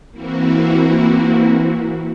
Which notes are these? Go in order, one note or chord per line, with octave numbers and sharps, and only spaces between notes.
E3 A#3 C4 E4 F#4